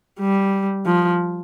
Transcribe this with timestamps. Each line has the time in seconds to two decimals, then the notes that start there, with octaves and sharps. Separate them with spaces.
0.19 G3
0.86 F3